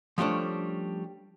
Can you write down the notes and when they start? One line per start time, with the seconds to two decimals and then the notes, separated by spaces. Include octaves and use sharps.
0.18 F3 G3 A3 C#4 D4